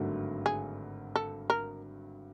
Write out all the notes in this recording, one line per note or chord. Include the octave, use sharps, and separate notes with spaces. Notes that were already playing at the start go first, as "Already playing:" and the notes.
Already playing: G#1 G2 D3 F#3 A3
G#4
A4
A#4